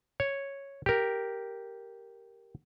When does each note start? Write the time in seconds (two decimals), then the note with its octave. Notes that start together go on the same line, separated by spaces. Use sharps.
0.20 C#5
0.86 G4 A#4